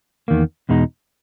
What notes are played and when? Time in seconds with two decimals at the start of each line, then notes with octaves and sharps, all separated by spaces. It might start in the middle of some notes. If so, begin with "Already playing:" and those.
0.28 E2 D#3 A#3
0.69 E2 B2 G#3 D#4